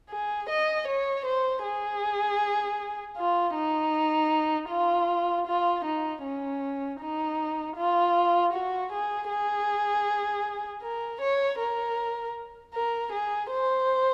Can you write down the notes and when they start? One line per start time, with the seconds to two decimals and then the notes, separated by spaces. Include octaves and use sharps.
0.10 G#4
0.49 D#5
0.87 C#5
1.26 C5
1.64 G#4
3.18 F4
3.55 D#4
4.70 F4
5.47 F4
5.84 D#4
6.24 C#4
7.01 D#4
7.76 F4
8.53 F#4
8.92 G#4
9.30 G#4
10.83 A#4
11.21 C#5
11.59 A#4
12.74 A#4
13.12 G#4
13.51 C5